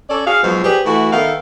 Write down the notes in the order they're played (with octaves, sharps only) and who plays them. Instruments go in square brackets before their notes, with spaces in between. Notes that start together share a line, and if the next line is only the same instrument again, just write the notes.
[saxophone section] C#4 A4 D5
F#4 G#4 F5
G#2 B2 F3 F#3
G4 G#4 B4 C5 D5
E3 A3 F#4
D#3 B3 A4 E5 F5